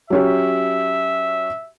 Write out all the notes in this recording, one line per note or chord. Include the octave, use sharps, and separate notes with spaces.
F#3 C#4 G4 E5